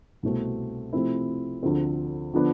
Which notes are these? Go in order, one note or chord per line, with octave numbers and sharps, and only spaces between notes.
C2 B2 A3 C4
C3 F3 A3 C4 E4
D2 D3 F3 C4 F4
D3 F3 B3 D4